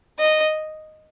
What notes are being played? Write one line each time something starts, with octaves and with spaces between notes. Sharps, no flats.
D#5